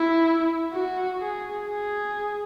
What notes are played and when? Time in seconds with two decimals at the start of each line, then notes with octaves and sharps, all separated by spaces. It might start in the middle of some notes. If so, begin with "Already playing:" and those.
Already playing: E4
0.73 F#4
1.21 G#4
1.69 G#4